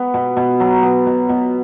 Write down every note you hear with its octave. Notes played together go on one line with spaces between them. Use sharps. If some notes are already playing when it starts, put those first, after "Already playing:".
Already playing: B3
B2
B2
F#3
B3
B2
B2